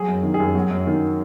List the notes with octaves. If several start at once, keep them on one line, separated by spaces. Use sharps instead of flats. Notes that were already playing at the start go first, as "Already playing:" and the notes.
Already playing: F#3 G#4
F#2
D#3
G#4
F#2
F#3
F#2
D#3